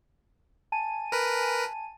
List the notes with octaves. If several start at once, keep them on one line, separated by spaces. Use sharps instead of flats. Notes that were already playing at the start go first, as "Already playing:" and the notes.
G#5 A5 D#7
A#4 B4